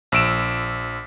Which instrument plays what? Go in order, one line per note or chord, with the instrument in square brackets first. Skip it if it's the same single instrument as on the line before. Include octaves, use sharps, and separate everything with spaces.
[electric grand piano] A#1 E6 D7 E7